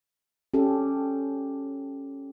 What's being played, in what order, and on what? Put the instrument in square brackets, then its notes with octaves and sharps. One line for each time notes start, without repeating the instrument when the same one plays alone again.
[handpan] C#4 G4 A4